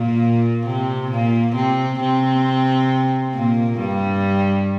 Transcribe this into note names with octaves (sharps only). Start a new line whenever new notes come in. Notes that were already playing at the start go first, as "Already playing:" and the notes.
Already playing: A#2 A#3
C3 C4
A#2 A#3
C3 C4
C3 C4
A#2 A#3
G2 G3